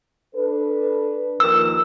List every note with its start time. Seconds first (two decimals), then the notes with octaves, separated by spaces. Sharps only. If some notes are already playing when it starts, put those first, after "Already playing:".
0.35 D4 A4 B4
1.40 D#2 F3 A#4 E6